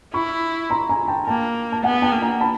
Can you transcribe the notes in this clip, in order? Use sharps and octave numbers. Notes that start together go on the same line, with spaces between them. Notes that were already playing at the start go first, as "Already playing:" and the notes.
E4 B5 C#6
A#5 C6
G#5 A#5
G5 A5
A#3 G5 A5
A5
B3 F#5 G#5
G5 A5
A#3
G#5 A#5
A5 B5